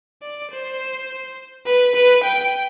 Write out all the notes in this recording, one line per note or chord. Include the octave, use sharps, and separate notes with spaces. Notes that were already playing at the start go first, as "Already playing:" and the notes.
D5
C5
B4
B4
G5